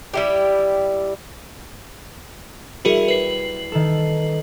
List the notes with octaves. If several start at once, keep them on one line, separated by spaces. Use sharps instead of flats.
G3 E4 G4
G3 E4 F#4 G#4 A#4
B4 C7 F#7
D#3 A4